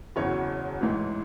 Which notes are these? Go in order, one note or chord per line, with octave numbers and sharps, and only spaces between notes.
F#1 E2 C#3 F#3 C#5
A1 G#2 E3